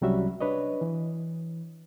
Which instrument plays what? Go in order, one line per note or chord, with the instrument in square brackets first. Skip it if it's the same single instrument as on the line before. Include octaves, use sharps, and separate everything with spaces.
[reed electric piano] C2 F#3 G3 C#4 F#4 E5
D4 B4 C#5 D#5
E3